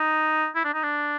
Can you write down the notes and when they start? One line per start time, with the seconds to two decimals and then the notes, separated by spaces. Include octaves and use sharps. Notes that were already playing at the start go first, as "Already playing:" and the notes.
Already playing: D#4
0.55 E4
0.64 D4
0.73 D#4
0.83 D4